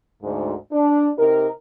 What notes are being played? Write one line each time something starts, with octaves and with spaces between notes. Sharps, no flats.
D2 G#2
D4
C3 D#4 G4 A#4